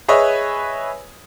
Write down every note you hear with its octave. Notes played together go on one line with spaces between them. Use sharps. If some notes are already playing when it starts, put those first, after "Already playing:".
G#4 B4 C#5 D#5 E5 G#5